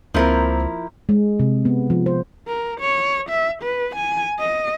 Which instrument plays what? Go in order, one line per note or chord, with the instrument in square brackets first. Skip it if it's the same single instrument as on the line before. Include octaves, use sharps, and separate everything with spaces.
[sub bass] C#2 [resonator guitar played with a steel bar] F3 E4 A#4 [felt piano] A#3 C4
[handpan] G#3
C3
B3
F3
C5
[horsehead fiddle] A#4
C#5
E5
B4
G#5
D#5